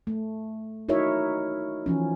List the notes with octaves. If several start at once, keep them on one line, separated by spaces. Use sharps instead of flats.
A3
D#4 E4 F#4 A#4 C#5 E5
E3 F3 C#4